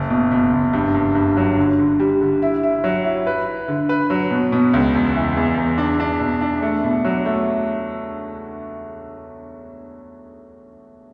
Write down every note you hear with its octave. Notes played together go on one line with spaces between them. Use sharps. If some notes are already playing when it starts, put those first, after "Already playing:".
Already playing: F#1
B2
B2
F#1
G2
G2
G2
F#3
D3
D3
G3
D3
E4
E4
F#3
E4
B4
E4
D3
B4
F#3
B2
B2
C#2
E2
E3
E2
E2
D4
D4
B2
D4
A3
B2
F#3
A3